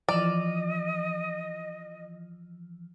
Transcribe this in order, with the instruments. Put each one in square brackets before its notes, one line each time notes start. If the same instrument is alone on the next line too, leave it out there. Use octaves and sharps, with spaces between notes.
[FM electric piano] E3 F3 [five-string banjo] D5 [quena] D#5